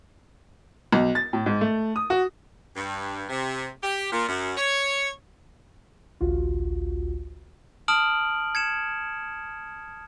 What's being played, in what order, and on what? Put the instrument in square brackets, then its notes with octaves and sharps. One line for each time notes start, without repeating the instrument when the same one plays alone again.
[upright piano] B1
A6
A2
G#2
A3
D#6
F#4
[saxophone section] G2
C3
G4
A#2
F#2
C#5
[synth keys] A1 D2 F4 F#4
[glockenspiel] A5 D#6 F6 D7 F#7
G#6 C#7 E7